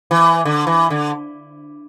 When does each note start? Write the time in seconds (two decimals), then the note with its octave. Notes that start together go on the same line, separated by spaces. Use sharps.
0.11 E3
0.45 D3
0.67 E3
0.90 D3